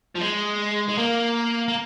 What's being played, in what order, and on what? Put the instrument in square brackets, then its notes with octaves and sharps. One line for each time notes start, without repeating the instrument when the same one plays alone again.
[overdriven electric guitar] F3
G#3
G#3
A#3
A#3